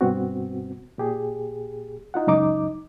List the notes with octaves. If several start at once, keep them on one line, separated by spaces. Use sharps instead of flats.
G2 B2 B3 C4 F#4
A#2 G4 G#4
D#4 F4 F#5
C#2 F#2 D#4 D6